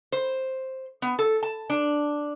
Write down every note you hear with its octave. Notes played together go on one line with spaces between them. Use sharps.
C5
B3
A4
A5
D4